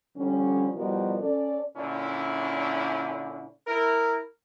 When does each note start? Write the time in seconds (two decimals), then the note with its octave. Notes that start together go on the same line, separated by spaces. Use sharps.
0.16 D3 F3 G3 C#4
0.74 B2 F3 G3 E4 F#4 A#4
1.21 C#4 A4 D5
1.76 A#2 D3 C#4 D4 E4
3.67 E4 A#4